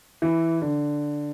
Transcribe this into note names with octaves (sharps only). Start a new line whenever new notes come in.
E3
D3